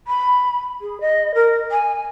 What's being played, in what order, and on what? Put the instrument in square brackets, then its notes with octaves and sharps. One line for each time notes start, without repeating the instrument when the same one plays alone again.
[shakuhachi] B5
G#4
D#5
A#4
G#5